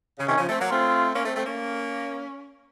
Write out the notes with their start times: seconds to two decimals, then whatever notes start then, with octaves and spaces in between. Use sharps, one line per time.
0.19 C#3
0.27 C3 D#3 C#4
0.38 C#3 F3
0.49 A3 C4
0.59 F#3 A#3
0.70 A3 C4 F4
1.14 A#3 C#4
1.24 A3 C4
1.36 A3 C4
1.46 A#3 C#4